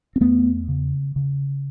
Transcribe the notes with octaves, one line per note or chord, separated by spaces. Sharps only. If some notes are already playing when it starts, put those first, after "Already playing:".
C4
E2 A3 B3
C#3
C#3